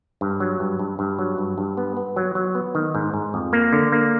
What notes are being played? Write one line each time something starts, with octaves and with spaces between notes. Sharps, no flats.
G2
F#3
G2
G2
G2
F#3
G2
G2
B3
B3
F#3
F#3
B3
D#3
G#2
G#2
F2
A#3
D3
A#3